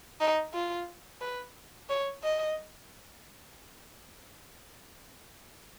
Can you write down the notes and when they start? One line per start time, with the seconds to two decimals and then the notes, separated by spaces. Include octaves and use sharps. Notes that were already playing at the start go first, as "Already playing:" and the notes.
0.21 D#4
0.53 F4
1.21 B4
1.89 C#5
2.23 D#5